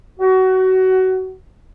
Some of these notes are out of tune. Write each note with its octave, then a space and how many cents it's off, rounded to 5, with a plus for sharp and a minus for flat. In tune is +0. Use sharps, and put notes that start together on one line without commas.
F#4 +20